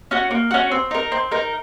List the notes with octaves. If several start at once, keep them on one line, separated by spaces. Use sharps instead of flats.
C#4 F#4
A#3
C#4 F#4
C4
D#4 A#4
C4
D#4 A#4